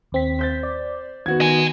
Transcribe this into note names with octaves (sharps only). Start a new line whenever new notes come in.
D#2 C4 B6
C5 G6 A6
D5
D#3 B3 F#4 G#6
D#3 D#5 G#5